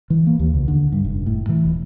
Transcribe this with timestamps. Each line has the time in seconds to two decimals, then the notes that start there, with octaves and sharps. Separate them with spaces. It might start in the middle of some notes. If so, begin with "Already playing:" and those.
0.10 E3
0.27 A#3
0.39 D#2
0.54 C#2
0.68 D3
0.92 G2
1.05 F1
1.26 A2
1.49 E3
1.65 E1